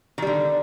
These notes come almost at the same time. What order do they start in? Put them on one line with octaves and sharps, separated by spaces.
D#3 G3 D3